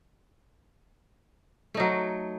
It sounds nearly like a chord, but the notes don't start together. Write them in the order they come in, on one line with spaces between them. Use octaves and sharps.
A3 D#4 F#3